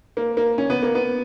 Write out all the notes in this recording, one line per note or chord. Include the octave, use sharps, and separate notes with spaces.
A#3
A#3
C#4
B3
A#3
B3